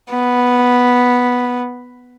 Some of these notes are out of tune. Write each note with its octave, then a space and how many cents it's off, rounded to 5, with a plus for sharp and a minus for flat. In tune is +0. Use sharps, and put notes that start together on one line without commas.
B3 -5